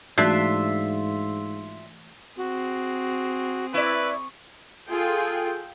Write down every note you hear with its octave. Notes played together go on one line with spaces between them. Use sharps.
G#2 E3 A3 D4 F4 F#4 D5 E5
C4 F#4 G#4
E4 B4 D5 C#6
F4 G#4 A4 G5